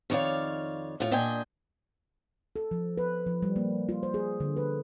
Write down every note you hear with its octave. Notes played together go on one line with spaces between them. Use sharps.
F2 D#3 C#5 D5 F5
A2 F4
A#2 D4 D#5 G5 G#5
A4
F3
B4
F3
G3
A#3
F4
C5
G#4
D3
B4